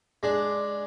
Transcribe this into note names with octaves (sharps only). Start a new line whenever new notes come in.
G#3 D4